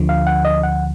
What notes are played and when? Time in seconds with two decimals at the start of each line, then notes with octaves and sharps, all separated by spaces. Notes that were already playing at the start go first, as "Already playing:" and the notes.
Already playing: D2 D3 F3
0.09 F5
0.27 F#5
0.45 D#5
0.63 F#5